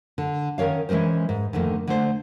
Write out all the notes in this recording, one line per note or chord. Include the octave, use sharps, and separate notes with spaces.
D3
D#3 C#4 A#4 C#5 F5
E3 G#3 C#4 A#4 C5
G#2
F2 D3 D#3 A3 A#3
D3 A3 C5